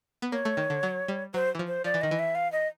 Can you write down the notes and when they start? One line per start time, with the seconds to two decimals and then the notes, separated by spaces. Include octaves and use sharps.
0.22 B3
0.32 A#3 C#5
0.45 A3
0.57 D#3
0.70 D3
0.83 F#3
1.08 G3
1.34 F#3 C5
1.55 E3
1.59 F3
1.67 C5
1.84 F3 D5
1.94 E3
2.01 D#3 D#5
2.11 E3
2.19 E5
2.35 F5
2.52 D#5